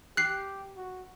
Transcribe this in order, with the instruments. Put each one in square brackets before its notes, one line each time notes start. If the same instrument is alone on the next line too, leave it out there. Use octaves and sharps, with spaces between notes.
[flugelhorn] G4 [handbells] F#6 C7
[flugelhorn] F#4